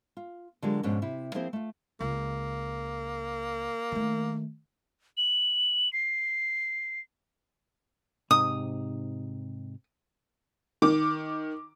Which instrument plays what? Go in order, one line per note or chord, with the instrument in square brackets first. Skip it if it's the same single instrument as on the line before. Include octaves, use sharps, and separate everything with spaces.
[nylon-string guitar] F4
D3 F#3 G#3 F4 G4 A#4
G#2 B2 F3 C#4 D4
C3 E4
F3 A#3 C4 E4 G#4 C5
A3 F4
[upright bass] C#2 [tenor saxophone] A#3
[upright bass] D#3 A3
[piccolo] F#7
C7
[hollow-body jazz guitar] G#2 C3 D#4 [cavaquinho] D#6
[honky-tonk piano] D#3 D6